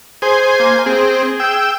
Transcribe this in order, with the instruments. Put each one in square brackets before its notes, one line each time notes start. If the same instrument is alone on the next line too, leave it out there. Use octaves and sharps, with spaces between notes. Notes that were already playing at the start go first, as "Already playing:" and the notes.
[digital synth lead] G#4 [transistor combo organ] C5 G#5
[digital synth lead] A#3
[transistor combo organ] C4 [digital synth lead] G#4
[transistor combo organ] G5 E6